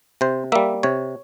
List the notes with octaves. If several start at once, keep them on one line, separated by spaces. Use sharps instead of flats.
C3 C5
G3 A#3 E5
C3 C#5